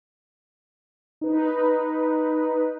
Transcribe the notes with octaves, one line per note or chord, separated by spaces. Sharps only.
D#4 B4